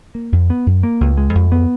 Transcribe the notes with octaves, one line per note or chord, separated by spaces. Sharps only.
A#3
F2
B3
F#2
A#3
C#2
G#3
F2
B3